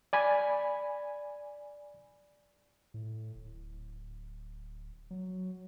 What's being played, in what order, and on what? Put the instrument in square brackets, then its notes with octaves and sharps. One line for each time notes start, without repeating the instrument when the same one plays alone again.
[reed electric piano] D5 G#5 B5
[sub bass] A2
D1
F#3